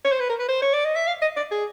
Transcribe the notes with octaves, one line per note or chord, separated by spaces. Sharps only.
C#5
C5
B4
A#4
B4
C5
C#5
D5
D#5
E5
F5
D#5
D5
G#4